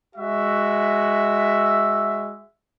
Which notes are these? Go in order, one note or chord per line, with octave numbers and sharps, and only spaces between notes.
G#3 F#4 E5